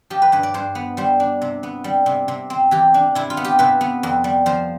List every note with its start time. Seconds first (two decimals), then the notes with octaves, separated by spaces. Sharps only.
0.10 F3 G4
0.22 B4
0.32 G2 B4
0.43 D5
0.54 G2 C5
0.75 B3
0.97 G3 C5
1.20 D4
1.42 C3
1.63 B3
1.84 G3
2.06 C3
2.28 C3
2.50 C4
2.71 E3 G4
2.94 D4
3.15 C3 E4
3.30 F4
3.37 B3
3.44 G4
3.59 C3 B4
3.81 B3
4.03 F2
4.24 G3
4.46 F3 C5